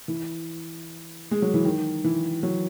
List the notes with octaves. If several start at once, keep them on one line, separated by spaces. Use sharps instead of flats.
E3
G#3
F#3
E3
D#3
E3
F#3